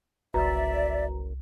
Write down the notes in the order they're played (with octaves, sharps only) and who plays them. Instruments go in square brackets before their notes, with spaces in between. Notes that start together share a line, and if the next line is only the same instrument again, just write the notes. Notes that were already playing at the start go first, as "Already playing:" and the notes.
[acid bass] F#1 [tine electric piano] C2 [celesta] F#4 B4 A#5 [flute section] D5 E5